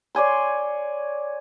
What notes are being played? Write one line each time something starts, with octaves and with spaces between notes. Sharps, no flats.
C#5 D5 G#5 C6